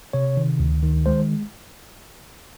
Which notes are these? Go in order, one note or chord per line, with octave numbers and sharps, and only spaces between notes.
C3 C#5
D#3
D2
D#3
G#3 C5